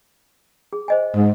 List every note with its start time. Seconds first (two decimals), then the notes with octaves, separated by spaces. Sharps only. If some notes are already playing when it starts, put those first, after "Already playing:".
0.73 G#4
0.88 C5 D#5 G#5
1.15 G#2